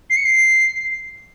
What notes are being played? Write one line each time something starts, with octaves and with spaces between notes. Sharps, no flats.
C7
C#7
C7